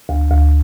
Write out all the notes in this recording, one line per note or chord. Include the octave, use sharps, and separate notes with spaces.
D2
D2